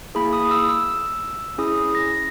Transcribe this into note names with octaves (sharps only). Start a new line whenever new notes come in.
A#3 E4 G#4 B5
D#6
E6
E6
C#4 E4 G#4 D#6
A#6